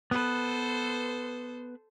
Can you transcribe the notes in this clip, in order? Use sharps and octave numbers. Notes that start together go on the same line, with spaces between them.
B3 A4 B4 C5